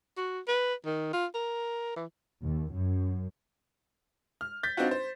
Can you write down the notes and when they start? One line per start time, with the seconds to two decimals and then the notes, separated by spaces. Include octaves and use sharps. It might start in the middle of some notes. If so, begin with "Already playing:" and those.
0.17 F#4
0.48 B4
0.85 D#3
1.13 F4
1.34 A#4
1.96 E3
2.42 D#2
2.72 F#2
4.41 F6
4.63 G6 A6 B6
4.77 C4 D4 D#4 F4 F#4
4.91 C5